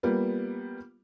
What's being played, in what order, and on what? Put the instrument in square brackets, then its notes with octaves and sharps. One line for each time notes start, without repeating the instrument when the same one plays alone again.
[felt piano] G3 A#3 B3 F4